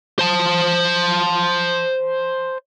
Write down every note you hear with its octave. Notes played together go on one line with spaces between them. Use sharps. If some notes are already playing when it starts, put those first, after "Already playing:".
C5 A5